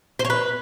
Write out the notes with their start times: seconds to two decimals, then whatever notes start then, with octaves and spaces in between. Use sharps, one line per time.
0.19 C5
0.25 C#5
0.30 B4